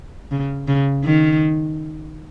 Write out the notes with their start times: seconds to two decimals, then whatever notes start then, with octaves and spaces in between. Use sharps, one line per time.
0.31 C#3
0.67 C#3
1.04 D#3